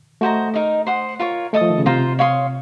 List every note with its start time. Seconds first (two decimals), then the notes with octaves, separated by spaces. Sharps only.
0.21 A3 F#4 C5 D#5 A#5
0.54 D#4 A#4 D#5
0.87 C5 F#5 C6 D#6
1.19 F4 A#4 C#5
1.53 A3 A4 D#5 A5 D#6
1.61 F3
1.70 D#3
1.78 C#3
1.86 C3 F4 C5 F5 A#5
2.19 C#5 F5 C6 D#6